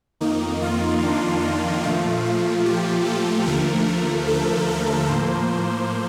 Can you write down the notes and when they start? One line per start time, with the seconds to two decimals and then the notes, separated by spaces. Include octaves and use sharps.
0.21 F2 D#3 A#3 D#4
0.62 F4
1.02 D4
1.42 D#4
1.83 A#2 F3 A3 F4
2.24 F4
2.65 G4
3.06 A4
3.46 D#2 D3 F3 A3 A#4
3.87 A#4
4.28 A4
4.68 A#4
5.09 A2 F3 A#3 C5